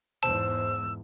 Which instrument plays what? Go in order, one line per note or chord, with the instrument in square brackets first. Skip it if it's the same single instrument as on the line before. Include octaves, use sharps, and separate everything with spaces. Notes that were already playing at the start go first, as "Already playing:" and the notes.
[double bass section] E2 G#2 [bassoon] C5 [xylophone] A5 [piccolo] E6